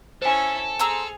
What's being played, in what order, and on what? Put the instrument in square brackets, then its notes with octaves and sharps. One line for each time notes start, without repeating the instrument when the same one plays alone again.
[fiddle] C#4 E4 [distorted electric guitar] A4 [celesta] C5 G#5
[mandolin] C4 A#5 E6 [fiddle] G#4 F6